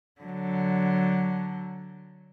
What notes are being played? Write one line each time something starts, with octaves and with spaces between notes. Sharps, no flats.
D3 F#3